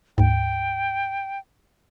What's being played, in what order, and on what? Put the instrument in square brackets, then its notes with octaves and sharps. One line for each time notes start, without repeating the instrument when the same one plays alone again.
[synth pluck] D2 G#2 [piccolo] G5